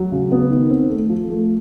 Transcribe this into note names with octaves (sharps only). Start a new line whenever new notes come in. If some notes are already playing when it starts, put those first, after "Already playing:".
Already playing: F#3
C#3
B3
D#3
C4
A3
F3
A3